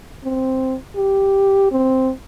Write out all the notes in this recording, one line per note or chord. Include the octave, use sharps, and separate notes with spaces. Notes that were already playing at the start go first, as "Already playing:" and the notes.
C4
G4
C4